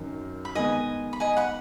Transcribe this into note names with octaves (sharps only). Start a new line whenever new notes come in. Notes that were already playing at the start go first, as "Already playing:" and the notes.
Already playing: F#2 D#3
B5
D#3 G#3 B3 D#5 G#5
B5
D#5 G#5
F#5 B5